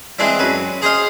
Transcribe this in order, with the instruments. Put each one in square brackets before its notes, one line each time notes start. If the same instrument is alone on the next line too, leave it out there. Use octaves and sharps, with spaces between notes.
[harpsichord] E3 G#3 C4 D4 E4
F#2 B4
G#4 C5 D#5 F5